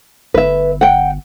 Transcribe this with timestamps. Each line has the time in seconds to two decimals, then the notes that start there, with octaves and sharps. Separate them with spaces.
0.34 G1 B4 E5
0.81 F#5 G5